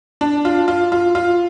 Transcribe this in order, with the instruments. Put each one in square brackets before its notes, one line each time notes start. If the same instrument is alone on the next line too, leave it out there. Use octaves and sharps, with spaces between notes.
[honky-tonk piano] D4
F4
F4
F4
F4